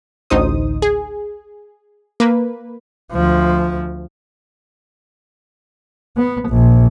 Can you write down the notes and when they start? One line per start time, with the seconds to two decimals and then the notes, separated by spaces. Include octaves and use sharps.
0.30 A1 D2 D#4 C5 D#6
0.82 G#4
2.20 A#3 B4
3.12 D2 F3
6.17 B3
6.49 A#1